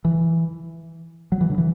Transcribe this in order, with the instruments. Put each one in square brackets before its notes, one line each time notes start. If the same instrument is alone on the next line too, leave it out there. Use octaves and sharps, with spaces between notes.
[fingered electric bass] E3
F#3
E3
D3
E3